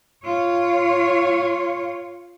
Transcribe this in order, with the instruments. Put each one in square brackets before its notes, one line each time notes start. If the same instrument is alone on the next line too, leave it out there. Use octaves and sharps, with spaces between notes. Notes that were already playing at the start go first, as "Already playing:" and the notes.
[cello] F4 C#5